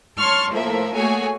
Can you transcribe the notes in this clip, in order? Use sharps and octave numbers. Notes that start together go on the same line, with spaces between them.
C#5 A5 C6 C#6 F6
A2 F3 A#3 A#4 E5
A3 A#3 F#4 G#4 C#5 G#5